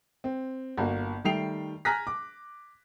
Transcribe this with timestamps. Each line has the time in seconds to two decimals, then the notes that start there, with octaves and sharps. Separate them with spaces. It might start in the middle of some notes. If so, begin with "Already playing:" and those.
0.24 C4
0.78 G1 A#3 F#4
1.24 D#3 G3 A3 G5 C7 F7
1.85 G#5 A#5 F6 F#6 A#6 B6
2.07 D6